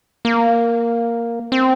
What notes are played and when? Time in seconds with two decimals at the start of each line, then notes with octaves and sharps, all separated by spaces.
0.25 A#3
1.52 C4